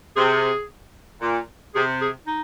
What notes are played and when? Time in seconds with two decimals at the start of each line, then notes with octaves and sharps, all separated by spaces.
0.16 C3 G#4
1.21 A#2
1.75 C3 G#4
2.01 G#4
2.27 D#4